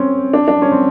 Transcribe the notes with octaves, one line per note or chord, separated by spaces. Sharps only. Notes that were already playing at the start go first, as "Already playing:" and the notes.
Already playing: C4 C#4
D4
D4
C#4
C4